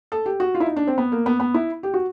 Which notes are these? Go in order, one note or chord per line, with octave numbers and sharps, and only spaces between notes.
A4
G4
F#4
F4
E4
D#4
D4
C4
B3
A#3
B3
B3
E4
G4
F#4